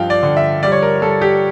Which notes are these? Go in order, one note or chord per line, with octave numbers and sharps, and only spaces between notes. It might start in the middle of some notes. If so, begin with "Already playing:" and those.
Already playing: G2 F3 F5 G5
D5
D3
E5
G3 D5
C#5
A#4
G3 A4
G4